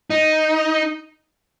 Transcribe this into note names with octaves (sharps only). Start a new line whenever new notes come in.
D#4